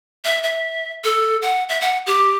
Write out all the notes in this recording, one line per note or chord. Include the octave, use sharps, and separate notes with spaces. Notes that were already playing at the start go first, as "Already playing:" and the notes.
E5
E5
A4
F#5
E5
F#5
G4